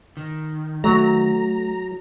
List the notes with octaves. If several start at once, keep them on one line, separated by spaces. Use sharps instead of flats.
D#3
F#3 A3 A#5